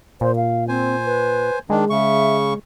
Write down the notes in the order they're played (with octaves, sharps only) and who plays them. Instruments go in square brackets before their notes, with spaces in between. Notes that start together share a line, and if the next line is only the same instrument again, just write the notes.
[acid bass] A#2 [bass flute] C5
[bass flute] F5
[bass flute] C4 [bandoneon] C5 G#5
[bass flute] B4
[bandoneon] D#3 D4 [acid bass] G#3
[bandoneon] C#3 C#6 [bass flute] E5